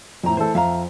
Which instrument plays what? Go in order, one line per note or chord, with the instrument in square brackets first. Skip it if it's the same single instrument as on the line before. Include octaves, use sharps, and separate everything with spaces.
[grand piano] F2 A2 [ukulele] D#4 A#5
[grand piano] E3 A3 A4 [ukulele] C5
[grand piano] F2 [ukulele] E5 F5 A#5